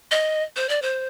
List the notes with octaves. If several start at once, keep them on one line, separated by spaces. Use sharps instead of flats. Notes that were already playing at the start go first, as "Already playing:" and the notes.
D#5
C5
D5
C5